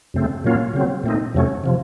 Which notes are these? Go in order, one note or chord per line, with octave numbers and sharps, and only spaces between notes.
F#2 C#3 A3 C4
A#2 F#3 A#3 C#4 F4
C#3 F#3 C4
A#2 A3 C4 D#4
F2 C3 F#3 A3 C#4
C3 F3